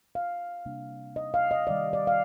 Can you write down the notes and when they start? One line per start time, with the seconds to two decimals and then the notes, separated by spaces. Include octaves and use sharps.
0.15 F5
0.66 C3 G3 A#3 D4
1.16 D#5
1.34 F5
1.51 D#5
1.67 C3 D#3 G3 D5
1.93 D5
2.07 F5